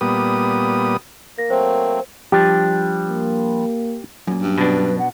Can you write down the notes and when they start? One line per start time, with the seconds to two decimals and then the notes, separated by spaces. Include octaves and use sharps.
0.01 A#2 G3 B3 D#6
1.38 A#3 A#6
1.50 F#3 A3 C4 C5
2.32 F3 G3 D4 G4
3.08 A#3
4.27 F#2 A#2
4.41 G2
4.58 B2 D4 B4
4.98 F#5